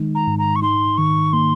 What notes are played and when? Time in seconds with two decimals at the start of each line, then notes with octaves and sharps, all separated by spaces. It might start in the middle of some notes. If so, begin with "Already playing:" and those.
Already playing: D#3 G#3 D#4
0.15 A#5
0.27 G#2
0.39 A#5
0.56 C#6
0.62 D#4 C6
0.97 D#3 C#6
1.33 A#3 C6